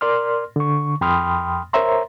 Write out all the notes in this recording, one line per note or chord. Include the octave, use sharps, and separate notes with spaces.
A#4 D5 C6 F6
D3 C#6
F2 G5 B5 C6 D#6 F6
A#4 C5 C#5 E5 A#5 C6